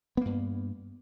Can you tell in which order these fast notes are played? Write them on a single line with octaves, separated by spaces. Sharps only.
B3 A#3 G2